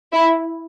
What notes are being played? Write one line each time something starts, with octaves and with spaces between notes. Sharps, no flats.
E4